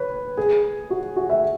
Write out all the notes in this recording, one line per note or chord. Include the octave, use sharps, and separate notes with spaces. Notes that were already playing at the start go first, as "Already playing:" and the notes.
Already playing: B4 C#5
G#4
F#4
F#4
E5